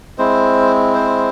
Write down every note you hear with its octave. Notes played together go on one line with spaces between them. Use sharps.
G#3 C4 E4 C5
C5